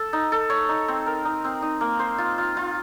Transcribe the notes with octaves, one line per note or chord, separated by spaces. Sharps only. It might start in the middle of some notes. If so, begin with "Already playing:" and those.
Already playing: A4
D#4
A4
C#5
D#4
C4
A#4
D#4
C4
D#4
A#3
C5
F4
F4
F4